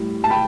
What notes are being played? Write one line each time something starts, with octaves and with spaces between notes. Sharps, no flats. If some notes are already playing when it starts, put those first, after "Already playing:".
Already playing: A2 G3
A5
G5 B5